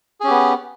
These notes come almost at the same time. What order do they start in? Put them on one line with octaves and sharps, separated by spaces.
G#4 C#4 G4 B3